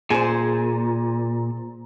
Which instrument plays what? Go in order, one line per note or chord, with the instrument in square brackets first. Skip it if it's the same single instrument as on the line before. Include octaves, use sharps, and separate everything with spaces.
[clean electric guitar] A#2 [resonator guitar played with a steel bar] G#4 C5